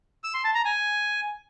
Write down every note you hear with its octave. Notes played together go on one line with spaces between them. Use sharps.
E6
C6
A5
A#5
G#5